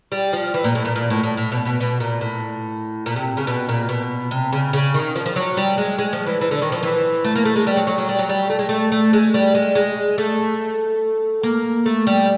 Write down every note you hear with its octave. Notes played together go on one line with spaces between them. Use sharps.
G3
F3
E3
A#2
A2
A#2
A#2
A2
A2
A2
B2
B2
B2
A#2
A2
A#2
C3
C#3
B2
A#2
B2
C3
C#3
C#3
D#3
F3
F3
F#3
G3
G#3
G#3
F3
E3
E3
D3
D#3
F3
E3
A3
A#3
A3
G#3
G3
F#3
F#3
F#3
G3
F#3
G3
A3
G#3
A3
A3
G#3
G3
G#3
G#3
A3
A#3
A3
G3